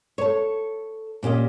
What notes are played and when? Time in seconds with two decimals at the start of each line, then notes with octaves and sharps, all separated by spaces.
0.18 A4 C#5
1.23 A#2 C#4 G4 D#5